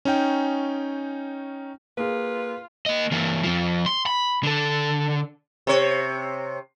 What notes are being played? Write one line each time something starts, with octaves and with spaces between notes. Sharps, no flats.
C#4 D#4 G5
A#3 F4 G#4 B4
A#3 D#5
E3 A#3
F2 F3
C6
B5
D3 A4
C3 C#5